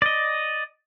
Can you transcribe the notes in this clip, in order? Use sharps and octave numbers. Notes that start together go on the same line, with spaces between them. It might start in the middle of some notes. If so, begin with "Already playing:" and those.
D5 D#5